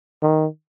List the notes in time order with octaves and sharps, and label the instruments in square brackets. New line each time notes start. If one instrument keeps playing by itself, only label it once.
[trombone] D#3